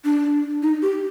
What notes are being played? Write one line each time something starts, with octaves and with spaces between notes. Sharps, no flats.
D4
D#4
G4